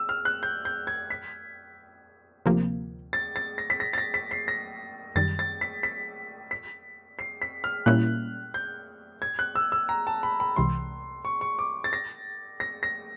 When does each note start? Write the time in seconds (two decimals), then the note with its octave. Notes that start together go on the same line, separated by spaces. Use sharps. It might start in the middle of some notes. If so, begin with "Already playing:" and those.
Already playing: E6
0.09 F6
0.25 F#6
0.43 G6
0.65 G6
0.87 G#6
1.10 B6
2.46 D2 C3 F3 A#3
3.13 A6
3.36 A6
3.58 A#6
3.70 B6
3.80 A#6
3.93 A6
3.98 A#6
4.14 B6
4.31 C7
4.48 A#6
5.16 F#2 D#3 G3 A6
5.39 A6
5.61 B6
5.83 B6
6.51 B6
7.19 C7
7.42 B6
7.64 F6
7.86 A#2 G3 A#3 C#4 E4 F#6
8.54 G6
9.22 G#6
9.39 F#6
9.55 E6
9.72 E6
9.89 A#5
10.07 A5
10.23 B5
10.40 B5
10.56 C2 C3 E3 G#3 C6
11.25 C#6
11.41 C#6
11.59 D6
11.84 A6
11.93 A#6
12.60 A#6
12.83 A#6